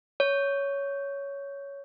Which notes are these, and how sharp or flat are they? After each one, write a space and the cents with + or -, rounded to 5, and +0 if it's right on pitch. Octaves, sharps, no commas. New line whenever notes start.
C#5 +10